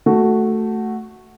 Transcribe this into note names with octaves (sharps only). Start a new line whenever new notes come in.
A3 F#4